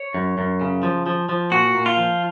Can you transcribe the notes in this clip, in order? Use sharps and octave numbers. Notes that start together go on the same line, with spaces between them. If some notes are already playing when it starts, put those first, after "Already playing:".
Already playing: C#5
F#2
F#2
C#3
F3
F3
F3
A#2 F#4
A#2
F4
F3